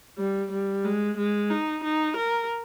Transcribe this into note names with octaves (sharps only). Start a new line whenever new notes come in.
G3
G3
G#3
G#3
D#4
D#4
A#4